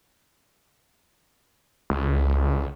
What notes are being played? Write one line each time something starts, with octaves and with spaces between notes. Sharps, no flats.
C#2